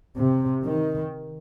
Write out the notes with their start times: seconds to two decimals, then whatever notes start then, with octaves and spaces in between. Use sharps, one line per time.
0.16 C3
0.65 D#3